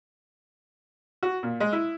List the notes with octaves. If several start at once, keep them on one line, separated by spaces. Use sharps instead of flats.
F#4
A#2
G#3
E4